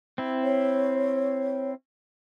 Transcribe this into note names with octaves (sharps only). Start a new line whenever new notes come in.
C4 E4
C#5